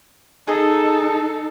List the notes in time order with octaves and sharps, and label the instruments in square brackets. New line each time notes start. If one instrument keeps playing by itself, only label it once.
[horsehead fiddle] D#4 A4 [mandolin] G#4 D#5